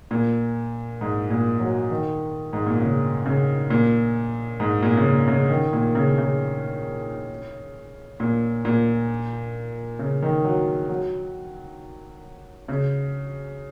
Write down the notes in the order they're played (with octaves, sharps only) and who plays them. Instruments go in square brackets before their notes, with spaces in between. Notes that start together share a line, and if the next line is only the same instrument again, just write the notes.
[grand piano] A#2
G#2
A#2
F#3
D#3
G#2
A#2
C#3
C#3
A#2
G#2
A#2
C#3
A#2
C#3
D#3
A#2
C#3
C#3
A#2
A#2
C#3
D#3
F#3
F#3
C#3